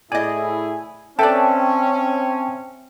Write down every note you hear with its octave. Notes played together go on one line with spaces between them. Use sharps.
A2 E4 G#4 D5 D#5 G#5
C4 C#4 A4 B4 D5 E5 G5 A5